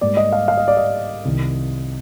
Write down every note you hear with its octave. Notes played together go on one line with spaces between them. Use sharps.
G#2 G3 A#3 D5
D#5
F5
F5
D#5
D5
D#5
C2 C3 D#3